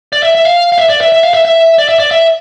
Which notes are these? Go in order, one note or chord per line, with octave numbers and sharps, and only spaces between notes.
D5
E5
E5
F5
F5
E5
D5
E5
E5
F5
E5
E5
D5
E5
D5
E5